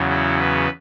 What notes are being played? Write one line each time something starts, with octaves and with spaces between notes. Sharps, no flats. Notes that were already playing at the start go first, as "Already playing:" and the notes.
Already playing: E2 C#3 F#3
E4
B4